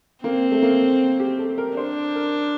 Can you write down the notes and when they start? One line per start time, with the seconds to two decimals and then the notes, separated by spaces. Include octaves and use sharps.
0.24 A#3 C4
0.52 A3
0.62 A#3
1.20 G4
1.39 A4
1.58 A#4
1.77 D4 C5
2.15 A#4